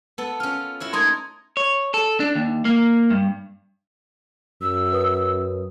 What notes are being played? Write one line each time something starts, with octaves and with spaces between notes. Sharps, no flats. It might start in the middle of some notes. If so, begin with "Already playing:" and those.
B3 A4
C#4 F4 F6
E4 F#4 C#5
A3 D#4 A#4 C6 D#6 G#6
C#5
A4
D4
D#2
A#3
G2
F#2 E6
B4 D#6